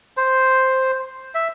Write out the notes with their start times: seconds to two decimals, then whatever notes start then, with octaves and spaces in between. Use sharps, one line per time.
0.17 C5
1.35 E5